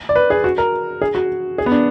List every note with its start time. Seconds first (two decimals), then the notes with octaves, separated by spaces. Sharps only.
0.09 D5
0.16 B4
0.30 G#4
0.44 F#4
0.58 A#4
1.02 G#4
1.15 F#4
1.58 G#4
1.66 B3
1.72 D4